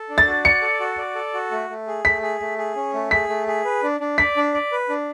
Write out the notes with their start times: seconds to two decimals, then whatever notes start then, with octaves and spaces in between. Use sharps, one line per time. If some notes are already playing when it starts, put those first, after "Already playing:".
Already playing: A4
0.09 D4
0.18 A6
0.27 F#4
0.44 D5 C#7
0.62 A4
0.80 F#4
0.98 D5
1.15 A4
1.34 F#4
1.51 A3
1.70 A3
1.87 G#4
2.05 A3 B6
2.22 G#4
2.40 A3
2.58 G#4
2.75 C#4
2.94 A3
3.11 G#4 B6
3.29 A3
3.47 G#4
3.65 B4
3.83 D4
4.00 D4
4.18 D5 B6
4.37 D4
4.54 D5
4.72 B4
4.89 D4